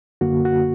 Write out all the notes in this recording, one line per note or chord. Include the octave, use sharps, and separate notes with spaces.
F#2 D3 A#3 F#4
F#4